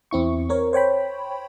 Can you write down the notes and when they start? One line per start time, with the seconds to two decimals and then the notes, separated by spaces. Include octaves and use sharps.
0.11 E2 C4 E4 C#6
0.49 C4 A#4 C#5
0.73 C5 C#5 G5 B5